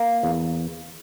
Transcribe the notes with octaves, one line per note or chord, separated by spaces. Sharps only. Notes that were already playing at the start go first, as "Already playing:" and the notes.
Already playing: A#3
E2